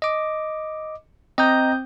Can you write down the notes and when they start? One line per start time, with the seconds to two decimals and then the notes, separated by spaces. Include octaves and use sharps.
0.02 D#5 D6
1.38 C4 D#5 A#5 D#6 G6